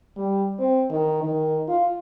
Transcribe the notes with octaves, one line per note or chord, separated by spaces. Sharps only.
G3
C4
D#3
D#3
F4